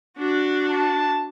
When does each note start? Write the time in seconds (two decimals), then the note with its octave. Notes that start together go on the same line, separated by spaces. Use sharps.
0.17 D4 F#4
0.71 A5